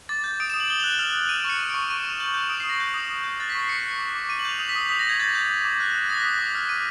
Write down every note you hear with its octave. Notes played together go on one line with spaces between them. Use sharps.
D6 A6
G6
D#6 D7
E7
D#6
F#7
D#6 G7
F7
F#6
E7
F6 F7
F6
F6 D#7
D7
C#6 C#7
F#6 D#7
D7
C#6
C#6 D#7
E7
C#6 F7
G6 F#7
G6
D#6 D7
D#6 C7
A#6
G6
D#6
D#6
G6
F#6 A6
B6
C#6 C7
F#6 C#7
F#6
D6
D6
D6 D#7
F#7
G6 F7
D#6 F7
B6
D#6
D#6 B6
A#6
D#6 G#6
G6 A6
G6
D6
D6
F#6
F#6
D#6 A#6
B6
D#6
D6
F6
D6 D#7